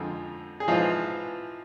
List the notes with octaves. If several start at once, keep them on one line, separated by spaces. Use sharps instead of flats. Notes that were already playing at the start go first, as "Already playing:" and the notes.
Already playing: F2 D3 F3 G#3
G#4
G#2 E3 F3 G#3 F4